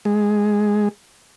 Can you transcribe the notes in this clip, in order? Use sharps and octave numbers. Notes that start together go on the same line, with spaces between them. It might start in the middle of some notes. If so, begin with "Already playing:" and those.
G#3